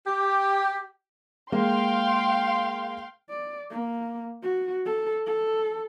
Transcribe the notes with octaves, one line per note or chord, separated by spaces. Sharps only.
G4
G#3 A#3 F5 G5 C6
D5
A#3
F#4
A4
A4